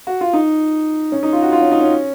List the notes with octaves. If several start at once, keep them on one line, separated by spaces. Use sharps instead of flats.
F#4
F4
D#4
C#4
D#4
F4
F#4
F4
C#4
D#4
C#4